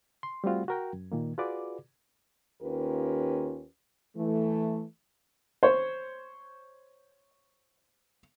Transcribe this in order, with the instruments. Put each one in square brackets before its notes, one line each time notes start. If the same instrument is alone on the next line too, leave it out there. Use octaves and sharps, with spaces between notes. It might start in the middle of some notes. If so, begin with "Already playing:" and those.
[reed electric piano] C6
G3 A3 C4 F4 F#4
F#4 A#4 G5
F#2
A#2 D#3 A#3
F4 F#4 G#4 B4 D5 D6
[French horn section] D#2 C#4 F4 G4 A#4 B4
E3 A3
[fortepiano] C5 C#5